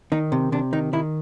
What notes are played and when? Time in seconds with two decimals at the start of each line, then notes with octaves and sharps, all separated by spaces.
0.12 D#3 D#4
0.32 C3
0.52 C3 D4
0.73 D#3 D#4
0.93 D#3 E4